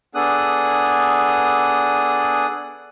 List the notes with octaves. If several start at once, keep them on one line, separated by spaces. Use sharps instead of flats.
B3 D4 G#4 A4 D#6 F#6